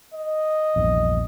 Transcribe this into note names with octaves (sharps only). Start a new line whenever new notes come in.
D#5
A#1 E2 G2